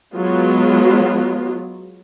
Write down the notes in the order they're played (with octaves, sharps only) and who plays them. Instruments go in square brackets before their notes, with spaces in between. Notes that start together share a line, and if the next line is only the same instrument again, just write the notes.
[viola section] F#3 G#3 B3 F4